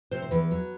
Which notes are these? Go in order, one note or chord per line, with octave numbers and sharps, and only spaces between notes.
C3 C5
C5
E2 B4
F#3